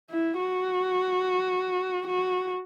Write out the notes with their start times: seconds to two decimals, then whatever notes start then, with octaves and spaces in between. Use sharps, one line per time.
0.11 E4
0.39 F#4
2.07 F#4